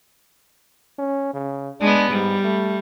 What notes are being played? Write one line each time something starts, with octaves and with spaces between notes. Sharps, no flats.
C#4
C#3
G#3 B3 D4
G#2 G3
A3